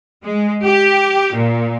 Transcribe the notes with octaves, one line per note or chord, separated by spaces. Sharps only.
G#3
G4
A#2